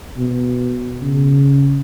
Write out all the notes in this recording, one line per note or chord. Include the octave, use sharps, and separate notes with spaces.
B2
C#3